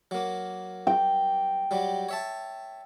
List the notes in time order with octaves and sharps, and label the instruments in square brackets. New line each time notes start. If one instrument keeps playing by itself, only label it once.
[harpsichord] F#3 A#3
[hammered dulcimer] G5
[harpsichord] F#3 G3
C#5 E5 A5